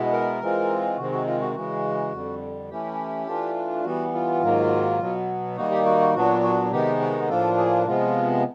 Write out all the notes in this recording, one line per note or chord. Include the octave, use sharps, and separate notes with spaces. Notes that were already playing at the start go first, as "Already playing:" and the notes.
Already playing: B2 G#3 B3 E4
A#4
E3 G#3 C4 F4
C3 D#3 G#3 C4 F#4
F#4
F4
F#4
C#3 E3 G#3 F#4
F2 D3 G3
E3 A3 C#4 E4 G4
E3 A3 D4 F4
E3 G3 B3 F#4
F4
G#2 D#3 F#3 A#3
B2 F#3 B3
D#3 G3 A#3 D#4 F#4
G4
F#4
F#4
A#2 F#3 B3 D4 F#4
F#4
C3 D#3 G#3 B3 D#4 G4
F#4
A2 F3 A#3 D4 F4 A4
G#4
C3 F3 G#3 B3 F4